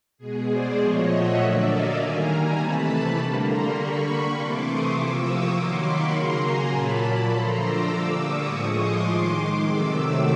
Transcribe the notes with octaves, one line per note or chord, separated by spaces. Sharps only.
B2 G#3 G#4
C5 D5
A#2 F3 A3 C#5 D#5
E5 F#5
D3 F#3 A#3 D5 E5
D#5 F5
D#3 G3 A#3 G#5 A#5
G#5 A#5
C3 E3 A3 A5 B5
D3 G3 A#3
A#5 C6
D3 G3 A#3 B5 C#6
C3 E3 A3 C6 D6
C#6 D#6
C3 F3 A#3 D6 E6
C#6 D#6
D#3 F#3 A#3 C6 D6
B5 C#6
C#3 F#3 A#3 A#5 C6
G#5 A#5
A#2 F#3 A#3 A5 B5
D3 F3 A3 A#5 C6
D6 E6
D3 G3 A#3
C#6 D#6
A2 F3 G#3 C#6 D#6
C6 D6
D#3 G#3 C6 D6
C6 D6
C3 D#3 F#3 A3 D6 E6
D6 E6